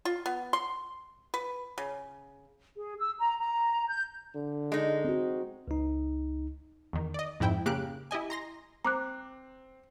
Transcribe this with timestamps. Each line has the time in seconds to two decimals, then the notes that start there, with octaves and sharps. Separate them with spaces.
0.05 F4
0.26 B3
0.53 C6
1.34 B4
1.78 C#3
2.77 G#4
2.99 E6
3.18 A#5
3.39 A#5
3.89 G6
4.35 D3
4.72 G#3 D#4
5.05 C4 F#4
5.68 C#2 D#4
6.93 E2 D#3
7.14 D5 D#5
7.40 F2 G#2 E4 G5
7.66 C#3 A#3 G4 F#6 D7
8.11 E4 G4 D#5 G#5
8.30 A#5 C6 A#6
8.85 C4 A#5 D6 F#6